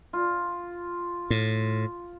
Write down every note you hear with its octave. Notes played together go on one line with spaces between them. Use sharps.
F4
A2